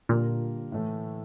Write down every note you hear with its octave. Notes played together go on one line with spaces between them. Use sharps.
A#2 D3 G3 A#3 F4 A#4
A2 E3 A3